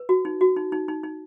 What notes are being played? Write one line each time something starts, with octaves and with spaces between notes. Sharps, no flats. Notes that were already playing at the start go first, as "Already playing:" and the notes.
Already playing: B4
F#4
D#4
F#4
D#4
D#4
D#4
D#4